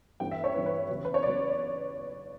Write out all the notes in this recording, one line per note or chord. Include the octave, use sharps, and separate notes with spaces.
G1 G2 E3 B3 G5
E5
C#5
G1 G2 E3 B3 B4
B4
E2 C#3 F#3 B3
B4
C#5
C#3 F#3 B3 D5